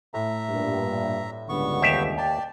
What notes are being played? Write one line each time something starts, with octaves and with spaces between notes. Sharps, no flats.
A2 E5 A#5
G2 A#2
C#2 G2 D3 B3 C#6
D#2 G4 E5
D5 G5 A5